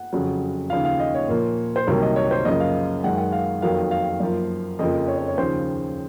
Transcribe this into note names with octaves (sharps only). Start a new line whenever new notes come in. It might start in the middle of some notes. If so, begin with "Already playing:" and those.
Already playing: F#5
F2 C#3 F#3
D#2 C#3 F3 F5
F5
D#5
C#5
A#2 F3 A#3
C5
C2 C3 D#3 F#3 A#3 C#5
D#5
C#5
C5
F#2 C#3 F3 A#3 D#5
F5
F#2 D#3 G#3 F#5
F#5
F5
F2 D#3 F#3 A#3 F5
F5
F#2 F3 A#3
F2 C#3 F3 A#3 D#5
C#5
C#5
C#5
D#2 C#3 F3 C5